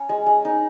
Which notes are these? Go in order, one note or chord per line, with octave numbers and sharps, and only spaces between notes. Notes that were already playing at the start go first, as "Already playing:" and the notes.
Already playing: C#4 G#5 A#5
G#3
G#3
D#4